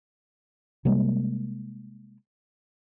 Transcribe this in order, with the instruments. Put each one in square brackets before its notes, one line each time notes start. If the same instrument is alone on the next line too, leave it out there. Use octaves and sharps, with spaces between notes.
[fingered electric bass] C3 G3 G#3 A#3